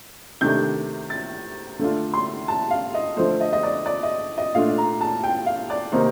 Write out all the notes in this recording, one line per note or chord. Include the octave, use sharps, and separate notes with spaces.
C3 D#3 A3 D4 G6
A6
D3 A3 D4 F4
C6
A5
F5
D#5
D3 F3 A3 C5
D#5
D#5
D5
D5
D#5
D#5
A#2 A3 D4 F4 F5
A#5
A5
G5
F5
D5
C3 D#3 A#3 D#4 C5